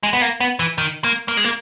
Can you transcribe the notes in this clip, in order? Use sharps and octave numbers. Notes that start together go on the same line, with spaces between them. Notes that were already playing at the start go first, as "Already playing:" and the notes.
G#3
B3
A#3
B3
E3
D#3
A#3
A#3
G#3
A#3